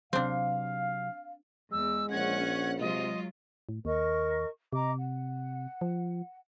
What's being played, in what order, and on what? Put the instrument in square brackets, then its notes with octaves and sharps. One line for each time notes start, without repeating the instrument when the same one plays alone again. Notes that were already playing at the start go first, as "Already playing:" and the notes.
[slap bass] C3 F#3 [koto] C4 D4 [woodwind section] F5
[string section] E2 [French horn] G#3 [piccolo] E6
[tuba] A#1 [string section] C#4 F#5 [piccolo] G#6
[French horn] C3 [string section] F#3 G#3 F4 [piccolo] D#5
[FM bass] A2
[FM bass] D#2 [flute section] A#4 D#5 C#6
[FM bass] C3 [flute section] D#5 A#5 D6
[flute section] F#5
[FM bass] F3